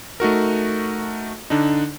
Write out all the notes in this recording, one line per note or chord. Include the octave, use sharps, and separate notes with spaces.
A3 D#4 F#4 A#4
D3 D4 D#4